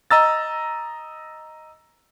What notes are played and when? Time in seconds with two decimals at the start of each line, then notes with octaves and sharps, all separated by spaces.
0.11 D#5 A#5 E6 A6